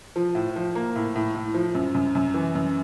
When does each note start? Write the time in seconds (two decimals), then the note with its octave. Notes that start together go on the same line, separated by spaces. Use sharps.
0.16 F3
0.35 A2
0.56 F3
0.75 A#3
0.96 A2
1.16 A2
1.35 A2
1.54 F3
1.75 F#2
1.95 F#2
2.15 F#2
2.34 E3
2.55 F#2